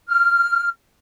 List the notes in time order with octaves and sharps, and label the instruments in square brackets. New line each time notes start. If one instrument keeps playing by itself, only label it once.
[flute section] F6